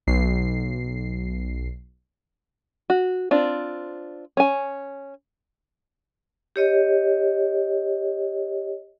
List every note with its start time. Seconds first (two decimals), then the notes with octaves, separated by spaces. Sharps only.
0.07 B1 C7
2.90 F#4
3.31 C4 D4 F4
4.37 C#4 G#5
6.56 G4 C#5 D#5